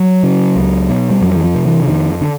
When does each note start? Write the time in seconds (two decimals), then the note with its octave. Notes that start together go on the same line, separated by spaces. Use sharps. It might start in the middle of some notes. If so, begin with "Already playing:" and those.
Already playing: F#3
0.23 C#3
0.56 C#2
0.89 B2
1.10 G3
1.22 F2 F#3
1.36 E3
1.44 F3
1.55 C3
1.66 E3
1.83 D3
1.88 F2 D#3
2.21 D3